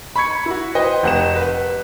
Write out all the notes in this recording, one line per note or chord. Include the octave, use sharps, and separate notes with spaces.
B5 C#6 G#6 C#7
E4 F#4
B4 C5 D#5 G5
F1 F#5 E7
B4